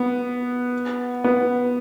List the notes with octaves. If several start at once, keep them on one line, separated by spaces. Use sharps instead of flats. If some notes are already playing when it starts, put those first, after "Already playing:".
Already playing: B3
B3